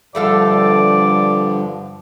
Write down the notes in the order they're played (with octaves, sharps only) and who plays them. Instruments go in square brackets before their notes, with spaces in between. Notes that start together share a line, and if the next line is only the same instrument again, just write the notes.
[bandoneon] G2 D3 F3 [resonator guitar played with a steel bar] A3 A4 F5 [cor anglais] D5